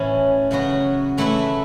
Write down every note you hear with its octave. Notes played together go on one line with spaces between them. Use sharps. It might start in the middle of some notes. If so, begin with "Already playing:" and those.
Already playing: A2 E3 C#4
C#3 F#3 B3 F#4
E3 A3 E4 B4 E5